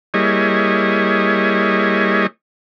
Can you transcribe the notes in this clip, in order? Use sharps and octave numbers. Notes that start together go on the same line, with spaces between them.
G3 A#3 E4 G#4 C#5 D#5